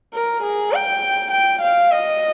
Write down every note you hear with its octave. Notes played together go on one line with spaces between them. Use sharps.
A#4
G#4
G5
G5
F5
D#5